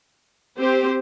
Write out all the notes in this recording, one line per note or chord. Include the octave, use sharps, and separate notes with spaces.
C4 G4 C5